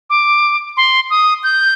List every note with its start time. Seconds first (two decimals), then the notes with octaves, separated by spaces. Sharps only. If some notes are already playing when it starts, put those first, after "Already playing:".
0.10 D6
0.77 C6
1.10 D#6
1.43 G6